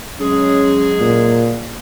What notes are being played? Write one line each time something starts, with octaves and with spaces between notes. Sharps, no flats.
F#3 G#3 C#4 G#4
A#2